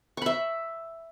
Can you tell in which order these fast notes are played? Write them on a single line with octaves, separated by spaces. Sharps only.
C#6 B5 E5